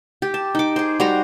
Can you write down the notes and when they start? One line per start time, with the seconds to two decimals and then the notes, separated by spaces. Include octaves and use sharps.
0.22 G4
0.34 A5
0.55 D#4 D6
0.76 G#4 C5
1.00 G3 F#4 C5 A#5